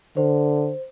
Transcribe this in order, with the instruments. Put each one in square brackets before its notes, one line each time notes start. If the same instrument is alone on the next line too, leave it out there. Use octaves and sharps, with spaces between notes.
[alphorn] D3 [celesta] C5